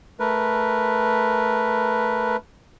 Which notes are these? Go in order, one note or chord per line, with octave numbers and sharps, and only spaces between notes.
A3 A#4 B4